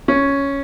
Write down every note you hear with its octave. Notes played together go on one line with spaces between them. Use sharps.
C#4